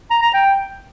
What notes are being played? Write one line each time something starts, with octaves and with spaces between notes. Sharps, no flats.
A#5
A#5
G5